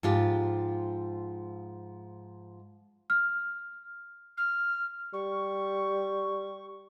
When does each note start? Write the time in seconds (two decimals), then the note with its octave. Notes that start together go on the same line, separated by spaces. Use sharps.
0.03 G#2 F3 F4 G4
3.10 F6
4.37 F6
5.13 G3 C#6